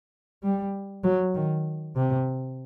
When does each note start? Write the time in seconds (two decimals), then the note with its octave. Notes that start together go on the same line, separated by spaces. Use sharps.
0.43 G3
1.04 F#3
1.35 D#3
1.96 C3